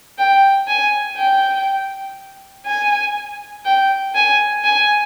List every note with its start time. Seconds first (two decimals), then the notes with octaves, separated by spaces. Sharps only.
0.18 G5
0.67 G#5
1.17 G5
2.66 G#5
3.65 G5
4.15 G#5
4.65 G#5